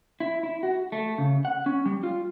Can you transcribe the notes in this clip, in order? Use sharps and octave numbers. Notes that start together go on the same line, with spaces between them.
E4
E4
F#4
A3
C#3
F#5
C#4
G3
F4